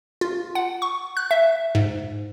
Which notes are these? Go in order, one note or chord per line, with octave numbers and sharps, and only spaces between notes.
F4
F#5
C#6
F#6
E5
G#2